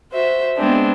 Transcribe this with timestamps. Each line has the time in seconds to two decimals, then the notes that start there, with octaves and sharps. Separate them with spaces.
0.12 F#4 C5 E5
0.56 G#3 B3 C4 D4 G#4